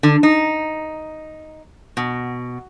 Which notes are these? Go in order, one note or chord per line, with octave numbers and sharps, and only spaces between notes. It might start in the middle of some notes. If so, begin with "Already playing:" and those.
D3
D#4
B2